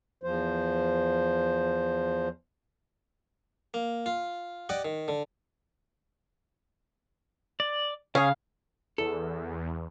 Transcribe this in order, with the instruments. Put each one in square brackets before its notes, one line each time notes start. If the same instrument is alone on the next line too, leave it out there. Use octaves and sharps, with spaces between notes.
[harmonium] E2 F3 C5
[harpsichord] A#3
F4
G4 D5 D#5 F#5
D#3
D3
[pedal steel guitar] D5
[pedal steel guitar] C#3 [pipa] C#4 G#4 [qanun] F5
[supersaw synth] E2 [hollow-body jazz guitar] A4